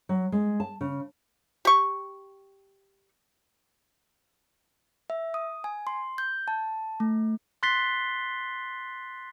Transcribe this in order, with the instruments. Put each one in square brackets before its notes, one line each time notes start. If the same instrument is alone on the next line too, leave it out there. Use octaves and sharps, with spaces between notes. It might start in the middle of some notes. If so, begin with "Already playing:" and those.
[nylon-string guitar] F#3
G#3
A5
C#3
[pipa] G4 C#6
[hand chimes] E5
D#6
G#5
C6
G6
A5
A3
[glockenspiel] C6 F#6 A6 B6 C7 G7